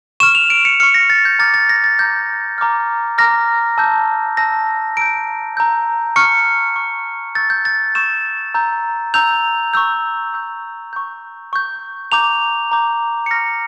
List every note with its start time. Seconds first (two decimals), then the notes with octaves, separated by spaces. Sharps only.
0.20 C#6 F6 E7
0.35 F7
0.50 D7
0.65 C#7
0.80 C#6 F6 C#7
0.94 A#6
1.10 A6
1.25 G6
1.39 A#5 D6 F6 A6
1.54 A6
1.69 A#6
1.84 A6
1.99 A#5 D6 F6 G6
2.58 A#5 D6 F6
3.18 A#5 D6 F6 A#6
3.78 A5 E6 G6
4.37 A5 E6 G6 A#6
4.97 A#5 E6 G6 D7
5.57 A#5 E6 G6
6.16 C#6 F6 C#7
6.76 C#6 F6
7.35 C#6 E6 G6 A6
7.50 G6
7.65 A6
7.95 C#6 E6 G6 E7
8.54 A#5 E6 G6
9.14 A#5 E6 G6 F7
9.74 C#6 E6 G6
10.34 C#6 E6 G6
10.93 C#6 G6
11.53 C#6 G6
12.12 A#5 D6 G6 F7
12.72 A#5 D6 G6
13.26 C#7
13.31 C#6 F6 A#6